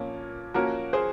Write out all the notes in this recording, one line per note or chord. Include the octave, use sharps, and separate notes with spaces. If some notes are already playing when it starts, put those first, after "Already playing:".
Already playing: A#2 F3 A#3 C#4
F3 A#3 C#4 F#4 A#4
G#4 C5